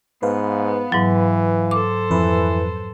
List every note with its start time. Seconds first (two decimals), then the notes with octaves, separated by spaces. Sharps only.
0.23 G#2 B3 B4 F5
0.92 G#2 E3 F#3
1.71 A4 C5 D6
2.11 F2 E3 B4